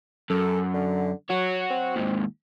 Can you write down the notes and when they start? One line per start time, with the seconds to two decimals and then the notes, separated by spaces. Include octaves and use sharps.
0.30 F#2 A4
0.74 D3
1.30 F#3 F#4 C#5
1.70 C4
1.96 D#2 G#2